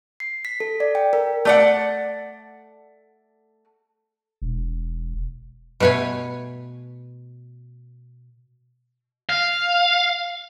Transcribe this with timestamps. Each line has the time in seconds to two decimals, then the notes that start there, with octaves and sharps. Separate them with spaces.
0.20 C7
0.45 B6
0.60 A4
0.80 D5
0.95 G5
1.13 A#4
1.45 A3 D5 F#5
4.42 E1
5.80 B2 A3 B4 C#5 G#5
9.29 F5